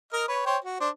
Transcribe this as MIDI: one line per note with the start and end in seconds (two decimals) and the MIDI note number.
0.13 0.24 70
0.13 0.24 75
0.13 0.24 89
0.28 0.41 71
0.28 0.41 73
0.46 0.57 72
0.46 0.57 73
0.46 0.57 79
0.64 0.77 66
0.80 0.89 62
0.80 0.89 72